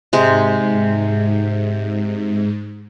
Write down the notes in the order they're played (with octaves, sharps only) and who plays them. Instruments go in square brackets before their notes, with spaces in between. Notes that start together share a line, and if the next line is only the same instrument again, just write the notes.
[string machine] G#2 [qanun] C3 G#3